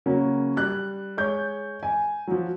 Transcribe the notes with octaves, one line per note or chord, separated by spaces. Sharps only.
C#3 F#3 A#3 C#4
G3 F#6
G#3 C#5 G6
G#5
F3 F#3